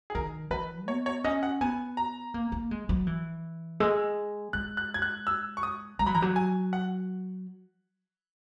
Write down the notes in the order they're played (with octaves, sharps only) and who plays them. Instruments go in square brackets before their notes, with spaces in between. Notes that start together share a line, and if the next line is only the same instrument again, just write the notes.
[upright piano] G#4
[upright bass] D#3 [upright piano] A#4
[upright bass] E3 [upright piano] B4
[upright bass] B3 [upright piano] C#5
[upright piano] C#5
[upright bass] C#4 [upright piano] D#5
[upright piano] F#5
[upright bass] B3 [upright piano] G#5
[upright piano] A#5
[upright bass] A#3
A#3
G#3
F#3
E3
[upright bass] G#3 [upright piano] E6
[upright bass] G#3 [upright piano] F#6
[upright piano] F#6
G#6
F#6
E6
C#6
D#6
[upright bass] G#3 [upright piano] A#5
[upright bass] F#3 [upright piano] B5
[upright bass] E3 [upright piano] A#5
[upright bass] F#3
[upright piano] G#5
F#5